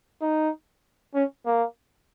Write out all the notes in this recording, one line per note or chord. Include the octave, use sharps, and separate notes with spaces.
D#4
C#4
A#3